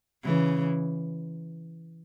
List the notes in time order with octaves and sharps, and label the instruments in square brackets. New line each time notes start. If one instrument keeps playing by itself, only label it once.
[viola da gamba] C#3 E3